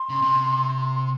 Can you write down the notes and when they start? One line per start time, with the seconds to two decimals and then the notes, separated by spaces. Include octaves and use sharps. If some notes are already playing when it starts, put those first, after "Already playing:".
Already playing: C6
0.09 C#3
0.22 C3